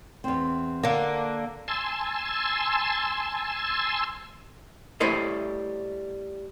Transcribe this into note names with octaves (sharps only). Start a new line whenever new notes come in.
E2 C4
D3 A#3 F5
G#5 A5 C6 E6
G3 A3 E4 C5 C#5 D#5